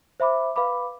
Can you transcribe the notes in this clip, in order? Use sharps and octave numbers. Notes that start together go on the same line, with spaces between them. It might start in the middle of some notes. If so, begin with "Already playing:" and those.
C5 E5 B5 D6
B4 F5 B5 D6